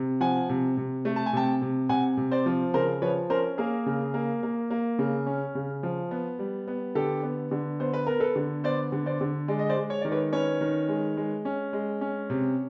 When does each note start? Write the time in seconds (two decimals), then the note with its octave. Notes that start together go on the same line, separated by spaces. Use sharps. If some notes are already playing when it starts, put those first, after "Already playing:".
Already playing: C3
0.21 F3 F#5 G#5
0.49 C3
0.77 C3
1.05 A3
1.16 A5
1.26 G#5
1.33 C3 G5 A5
1.62 C3
1.89 C3 F#5 G#5
2.17 C3
2.32 C5 D5
2.46 F3
2.74 C#3 A#4 C5
3.02 F3 B4 C#5
3.30 C#4 A#4 C5
3.58 A#3 G#4 A#4
3.86 C#3
4.14 A#3
4.43 A#3
4.70 A#3
4.99 C#3
5.26 C#4
5.55 C#3
5.83 F3
6.11 B3
6.39 G3
6.68 B3
6.95 D3 G4 A4
7.23 B3
7.51 D3
7.80 B3 C5
7.93 B4
8.07 B3 A#4
8.20 A4 B4
8.36 D3
8.64 B3 C5 D5
8.92 D3
9.06 C5 D5
9.21 D3
9.48 G#3 D5
9.59 D#5
9.69 C5 D5
9.77 G#3
9.90 C#5
10.01 D#3 D5
10.12 B4 C#5
10.32 C#4 B4 C#5
10.61 D#3
10.89 G#3
11.17 G#3
11.45 C#4
11.73 G#3
12.01 C#4
12.30 C3